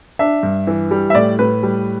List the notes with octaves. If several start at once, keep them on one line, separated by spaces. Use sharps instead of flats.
D4 E5
G2
E3
G3
E5
A2 D5
A2 B4
G3